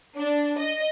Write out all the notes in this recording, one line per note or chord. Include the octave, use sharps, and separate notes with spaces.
D4
D#5